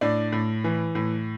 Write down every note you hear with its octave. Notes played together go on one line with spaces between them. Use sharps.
A2 D4 D5
A2
E3
A2